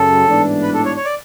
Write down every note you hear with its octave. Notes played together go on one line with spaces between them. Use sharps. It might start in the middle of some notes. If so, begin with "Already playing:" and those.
Already playing: F#2 C#3 A4
A1 G#2 E3 B3 D4
B4
A4
C#5
C#5
D5